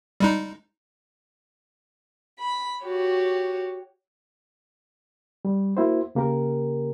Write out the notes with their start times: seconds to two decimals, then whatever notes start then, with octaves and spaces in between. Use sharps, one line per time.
0.20 G3 G#3 D#4
2.39 B5
2.85 F#4 G4 C#5
5.45 G3
5.77 A#3 E4 F#4 C5
6.15 C#3 A#3 G4 A#4